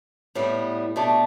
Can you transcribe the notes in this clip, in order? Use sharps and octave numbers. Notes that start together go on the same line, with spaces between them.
A2 G3 B3
B2 A3 D4